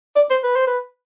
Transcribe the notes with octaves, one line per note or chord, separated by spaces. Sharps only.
D5
C5
B4
C5
B4